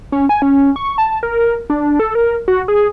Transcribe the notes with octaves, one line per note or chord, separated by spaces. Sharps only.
C#4
G#5
C#4
C#6
A5
A#4
D4
A4
A#4
F#4
G#4